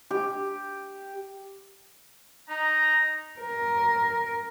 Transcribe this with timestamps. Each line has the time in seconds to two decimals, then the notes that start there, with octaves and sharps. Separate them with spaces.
0.11 G4
2.49 D#4 A#5
3.40 A#4